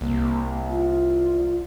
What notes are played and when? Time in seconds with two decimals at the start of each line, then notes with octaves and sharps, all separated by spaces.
0.01 C2 A#3
0.70 F4